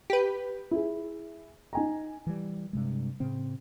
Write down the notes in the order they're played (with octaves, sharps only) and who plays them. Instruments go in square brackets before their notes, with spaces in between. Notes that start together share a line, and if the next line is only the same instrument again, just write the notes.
[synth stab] G4 B4
[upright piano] E4 G#4
D#4 G#5 A#5
[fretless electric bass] E3 G3
G2 C3 G#3
A2 C#3 C4